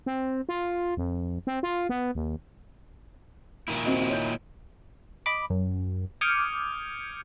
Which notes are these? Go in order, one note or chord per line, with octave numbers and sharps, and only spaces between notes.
C4
F4
F2
C4
F4
B3
D#2
A#2 D#3 E4
C4 F#4 D#5
C#5 D#5 G6
D#5 B5 D6
F#2
D6 D#6 F6 G6 G#6 C#7